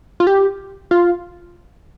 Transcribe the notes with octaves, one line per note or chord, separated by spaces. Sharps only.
F4
G4
F4